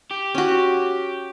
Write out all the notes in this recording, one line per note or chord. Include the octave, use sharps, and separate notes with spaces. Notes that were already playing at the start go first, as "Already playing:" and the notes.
G4
C#4 F#4